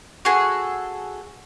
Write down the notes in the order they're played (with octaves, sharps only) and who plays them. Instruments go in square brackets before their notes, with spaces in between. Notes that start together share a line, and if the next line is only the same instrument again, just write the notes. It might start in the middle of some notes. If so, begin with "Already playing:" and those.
[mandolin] F#4 G#4 A4